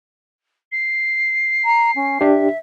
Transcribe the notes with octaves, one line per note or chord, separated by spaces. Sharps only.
C7
A#5
C#4
D4 G4 E5